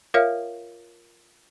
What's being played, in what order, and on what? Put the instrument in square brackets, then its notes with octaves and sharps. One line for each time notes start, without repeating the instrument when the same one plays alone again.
[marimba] F4 A#4 C#5 E5 F5 F6